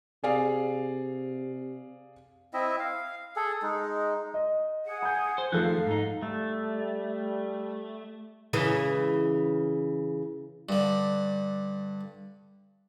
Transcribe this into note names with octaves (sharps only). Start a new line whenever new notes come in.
C3 G#4 D5 F5
C4 E4 D#5 E5
F5
G#4 A4
G#3 D#4
D#5
G#4 F#5
G#5 G6
C5
F2 D#3 F3 A3 A4 F5 F#6
G#2 D#4
G3 A3
C#3 E3 G#3
G2 D3